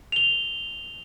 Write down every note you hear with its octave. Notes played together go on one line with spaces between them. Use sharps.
F7 G7